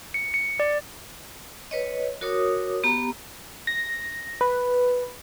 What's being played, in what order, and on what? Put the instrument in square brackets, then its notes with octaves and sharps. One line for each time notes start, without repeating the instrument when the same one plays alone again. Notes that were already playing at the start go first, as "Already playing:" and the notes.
[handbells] C#7
C#7
D5
[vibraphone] B4 C#5 D#5
F#4 A#4 C#5 D6 D#6
B3 G4 A#5
[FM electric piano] A#6
B4